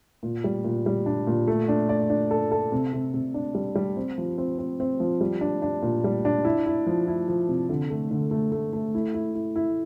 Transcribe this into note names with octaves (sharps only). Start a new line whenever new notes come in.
A#2
G3
A#2
G3
D4
A#2
A3
D4
D5
D4
A4
A4
C3
C3
C3
D4
G3
G3
C4
F3
C4
C4
C4
F3
G3
D4
D4
A#2
G3
D4
E4
E4
F3
E4
F3
C3
D3
A3
D3
A3
A3
A3
E4
E4
E4
E4